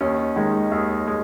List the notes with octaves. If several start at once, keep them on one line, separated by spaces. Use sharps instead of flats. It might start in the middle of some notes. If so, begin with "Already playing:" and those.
D#2 C#4
D#3 G#3
D#2
G#3